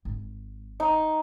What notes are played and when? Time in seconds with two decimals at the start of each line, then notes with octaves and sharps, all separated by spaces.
0.05 G#1
0.80 D#4